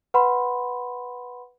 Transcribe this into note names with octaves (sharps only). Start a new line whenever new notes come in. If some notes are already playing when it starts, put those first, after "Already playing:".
B4 F#5 B5 C6